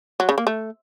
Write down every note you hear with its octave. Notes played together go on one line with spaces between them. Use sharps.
F#3
C#3
A#3
A3